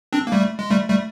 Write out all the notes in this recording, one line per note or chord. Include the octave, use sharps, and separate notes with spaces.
C4 D4
A#3
G3 A3
G#3
G3 A3
G3 A3